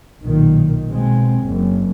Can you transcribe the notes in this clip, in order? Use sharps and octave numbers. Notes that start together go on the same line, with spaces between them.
B1 A#2 D#3
B2 G#3 C4
F#1